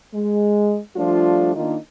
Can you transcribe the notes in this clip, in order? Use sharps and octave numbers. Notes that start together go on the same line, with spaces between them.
G#3
F3 G3 A3 D4 F4
D#3 A#3 D4 D#4 F4